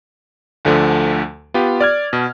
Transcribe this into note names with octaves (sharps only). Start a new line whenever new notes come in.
D2 D3 F3 A3
B3 F4 G4
D5 F6 G#6
B2